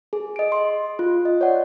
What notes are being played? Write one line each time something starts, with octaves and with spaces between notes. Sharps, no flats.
G#4
D#5 D7
C6
F4
D#5
C#5 D5 F#5